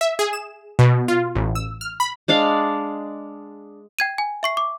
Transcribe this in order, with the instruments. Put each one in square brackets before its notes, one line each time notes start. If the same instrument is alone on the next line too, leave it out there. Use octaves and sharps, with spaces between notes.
[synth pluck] E5
G#4
E7
B2
F4
A1
E6
F6
B5
[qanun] G#3 D4 D5 F5
[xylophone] G5 G#6 D#7
G#5
E5 C#6 C7
D6